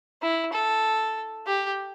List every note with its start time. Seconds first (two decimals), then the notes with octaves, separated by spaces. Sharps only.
0.22 E4
0.53 A4
1.47 G4